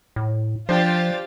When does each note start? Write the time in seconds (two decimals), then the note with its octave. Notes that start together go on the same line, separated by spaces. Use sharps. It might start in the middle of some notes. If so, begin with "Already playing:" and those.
0.16 A2
0.69 F3 D4 F4 G4 C5 A6